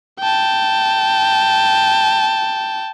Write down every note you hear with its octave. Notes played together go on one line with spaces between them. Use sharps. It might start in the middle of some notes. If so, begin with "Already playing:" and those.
G5 A5